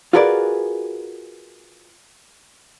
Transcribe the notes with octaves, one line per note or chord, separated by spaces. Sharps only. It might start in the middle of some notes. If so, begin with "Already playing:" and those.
F4 F#4 G#4 A#4 B4 D5